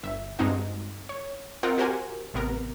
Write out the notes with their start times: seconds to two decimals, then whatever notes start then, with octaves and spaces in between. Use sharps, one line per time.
0.03 G1 E5
0.39 G2 G#3 C4 D#4 F#4
1.09 C#5
1.63 C4 F4 A#4 D#5 F#5 G5
1.78 F#4 G4 A#4 C5 F#5 G#5
2.34 A1 C3 B3 A#4